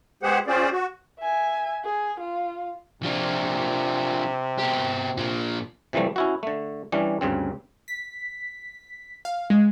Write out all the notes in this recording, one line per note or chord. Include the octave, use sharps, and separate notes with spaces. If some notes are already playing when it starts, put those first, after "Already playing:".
G#3 B3 G4 G#4 C5 F#5
C4 C#4 F4 G#4 C5 D5
F#4
E5 G#5
G#4
F4
C3 F3 D4
B2 G4
A#2 F3
C3 E3 F3 G3 A3
C#4 E4 F#4
D3 A3
E3 G3 C#4 D4
D2 G2 C#3 C4
B6
F5
G#3